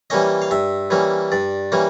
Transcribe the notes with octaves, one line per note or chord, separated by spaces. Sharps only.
E3 G3 A#3 C#4 D#5
F5
G2 E5
E3 G3 A#3 C#4
G2 D5
E3 G3 A#3 C#4